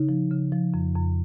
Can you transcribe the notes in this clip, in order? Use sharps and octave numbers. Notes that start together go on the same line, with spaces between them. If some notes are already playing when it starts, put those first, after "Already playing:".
Already playing: C#3 D#4
F3
C#3
F3
F2
F2